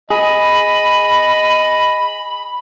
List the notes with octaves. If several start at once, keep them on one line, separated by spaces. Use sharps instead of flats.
G#4 D#5 B5